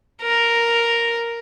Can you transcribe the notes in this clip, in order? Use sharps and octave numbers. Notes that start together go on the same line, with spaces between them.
A#4